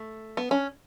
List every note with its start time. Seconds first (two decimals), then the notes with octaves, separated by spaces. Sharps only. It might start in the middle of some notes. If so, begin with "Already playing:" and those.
Already playing: A3
0.37 B3
0.51 C#4